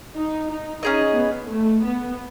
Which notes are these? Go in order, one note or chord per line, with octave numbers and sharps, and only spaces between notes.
D#4
D#4
C#4 D#4 G#4 D#5
B3
A3
B3